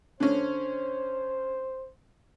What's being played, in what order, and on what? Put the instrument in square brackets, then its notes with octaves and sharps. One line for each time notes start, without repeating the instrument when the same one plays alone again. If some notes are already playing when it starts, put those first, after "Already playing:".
[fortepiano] D3 C#4 [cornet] C5